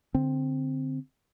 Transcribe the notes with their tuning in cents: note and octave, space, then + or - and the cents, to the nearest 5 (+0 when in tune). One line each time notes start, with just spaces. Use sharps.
D3 +0 C4 +0